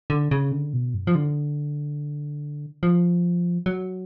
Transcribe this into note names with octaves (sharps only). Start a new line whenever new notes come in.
D3
C#3
D3
B2
F#2
F3
D3
F3
F#3